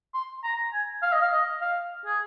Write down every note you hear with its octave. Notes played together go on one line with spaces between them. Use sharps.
C6
A#5
G#5
F5
D#5
F5
D#5
F5
G#4